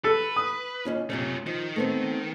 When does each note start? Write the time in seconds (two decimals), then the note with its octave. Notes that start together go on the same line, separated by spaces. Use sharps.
0.04 A4 B4
0.36 D#6
0.85 D#2 C#4 F4
1.10 C3 F#3 A3 C#4 F4
1.46 D#3 F3
1.76 A3 B3 C4